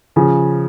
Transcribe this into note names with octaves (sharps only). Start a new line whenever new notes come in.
C#3 F3